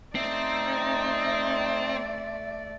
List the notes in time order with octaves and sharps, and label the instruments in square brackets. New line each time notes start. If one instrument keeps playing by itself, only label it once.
[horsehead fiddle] A3 D5 [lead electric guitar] C4 [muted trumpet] D#4 [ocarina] E5